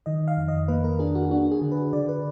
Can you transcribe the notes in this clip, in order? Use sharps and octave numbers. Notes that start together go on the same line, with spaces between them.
D#3 D#5
F5
F2
D#5
A#3 B4
A#4
D4 G#4
F#4
D4 F#4
G#4
D3
B4
D3 D5
B4